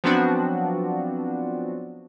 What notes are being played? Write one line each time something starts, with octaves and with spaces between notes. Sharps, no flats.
F3 F#3 B3 C4 D4 F#4